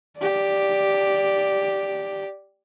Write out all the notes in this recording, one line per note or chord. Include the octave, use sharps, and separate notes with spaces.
G4 D5